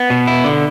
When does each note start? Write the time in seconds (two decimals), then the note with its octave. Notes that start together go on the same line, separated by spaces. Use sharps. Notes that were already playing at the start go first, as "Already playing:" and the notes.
Already playing: B3
0.10 B2
0.27 E4
0.44 D3